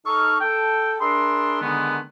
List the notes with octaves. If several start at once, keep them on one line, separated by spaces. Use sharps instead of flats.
D#4 A4 C#6 F6
A4 G5
D4 G#4 A#4 E5 B5 C6
D3 D#3 G#3 B3